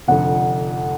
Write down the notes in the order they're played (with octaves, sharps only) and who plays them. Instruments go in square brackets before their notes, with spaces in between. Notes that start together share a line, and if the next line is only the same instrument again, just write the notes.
[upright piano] F1 F2 D3 [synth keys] F#5